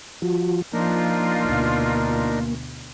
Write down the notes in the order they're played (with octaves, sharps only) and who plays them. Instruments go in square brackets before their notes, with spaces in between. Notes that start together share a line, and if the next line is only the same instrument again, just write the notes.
[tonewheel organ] F3 F4 F#4
[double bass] F3 [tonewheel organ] A#3 [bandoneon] D4 D#4 A#4 [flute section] F4
[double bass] D2 B2